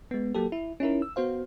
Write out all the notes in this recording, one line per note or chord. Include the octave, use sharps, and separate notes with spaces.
G#3 B3
F#3 A#3 G4 A4
E4
C#4 D#4 E4 A#4
E6
B3 F#4 C5 F5